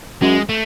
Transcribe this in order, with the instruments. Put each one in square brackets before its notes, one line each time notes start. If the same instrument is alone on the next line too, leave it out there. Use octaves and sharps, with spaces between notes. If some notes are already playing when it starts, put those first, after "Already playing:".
[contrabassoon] F#2 [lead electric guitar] G#3
[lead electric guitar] A3